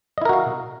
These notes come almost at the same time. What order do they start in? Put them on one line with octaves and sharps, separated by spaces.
D#5 E4 A#4 F#4 F5